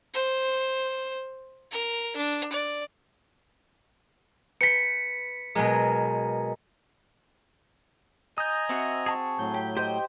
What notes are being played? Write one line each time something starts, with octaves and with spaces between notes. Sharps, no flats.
C5
A#4
D4
D5
B4 G5 B6 C#7
B2 F#3 G#3 A#4
D#5 G#5 A#5 D#6 G6
C4 F#4 E5 F#5
G#4 A5 C#6
A2 F#3 G6
G4
G4 C5 D#5 G5